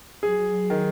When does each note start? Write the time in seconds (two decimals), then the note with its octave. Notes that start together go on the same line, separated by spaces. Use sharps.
0.23 F#3 G#4
0.70 D#3